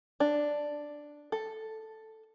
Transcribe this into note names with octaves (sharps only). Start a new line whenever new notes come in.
D4
A4